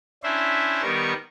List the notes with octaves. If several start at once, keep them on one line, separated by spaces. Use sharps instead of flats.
C#4 D4 E4 C5 E5
D#3 G3 B3 A#4 C#6